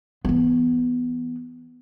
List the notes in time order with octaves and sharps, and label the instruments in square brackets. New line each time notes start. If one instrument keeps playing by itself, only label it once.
[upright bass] E3 B3